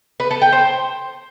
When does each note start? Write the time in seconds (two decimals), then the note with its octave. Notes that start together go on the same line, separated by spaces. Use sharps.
0.20 B4
0.31 A4
0.42 G5
0.53 C5